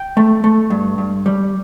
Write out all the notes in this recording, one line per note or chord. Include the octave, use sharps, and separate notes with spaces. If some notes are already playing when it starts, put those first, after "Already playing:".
Already playing: G5
A3
A3
G2
G2
G3